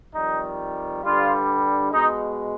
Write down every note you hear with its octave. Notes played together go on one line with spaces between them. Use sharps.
F2 D#3 G3 D#4
G2 D3 G3 F4
B2 G#3 D#4